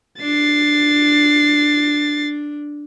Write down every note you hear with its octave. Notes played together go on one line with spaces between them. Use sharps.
D4 A6 C7